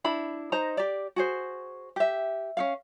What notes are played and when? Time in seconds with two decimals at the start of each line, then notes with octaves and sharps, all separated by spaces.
0.04 D4 E4 B5
0.52 D#4 C5 D#5 A#5
0.77 G4 D5
1.16 F#4 G#4 C5
1.96 G4 E5
2.57 C#4 D#4 F5